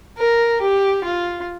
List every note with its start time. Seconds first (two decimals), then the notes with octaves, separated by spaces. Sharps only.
0.17 A#4
0.61 G4
1.04 F4